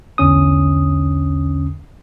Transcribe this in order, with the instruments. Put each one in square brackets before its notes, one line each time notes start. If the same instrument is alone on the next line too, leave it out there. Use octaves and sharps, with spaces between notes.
[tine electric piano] B1 E2 D3 C#4 D#6